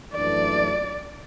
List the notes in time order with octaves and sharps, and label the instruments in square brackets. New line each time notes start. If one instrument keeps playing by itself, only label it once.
[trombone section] F#2 E3 A3 D4 [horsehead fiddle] D5